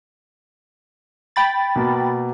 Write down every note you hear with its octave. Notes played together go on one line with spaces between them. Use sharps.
G5 B5 A6
B2 A#3